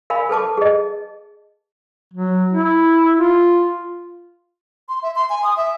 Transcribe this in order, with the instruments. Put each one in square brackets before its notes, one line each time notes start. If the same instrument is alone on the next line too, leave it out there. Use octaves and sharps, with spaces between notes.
[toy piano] A#4 F5 G#5 B5
A4 B4 A5 D6
G#4 D#5
[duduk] F#3
E4
F4
[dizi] C6
E5
C6
G#5
D#6
E5